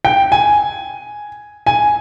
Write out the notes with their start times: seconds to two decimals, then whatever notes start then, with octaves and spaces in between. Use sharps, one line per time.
0.05 G5
0.32 G#5
1.66 G#5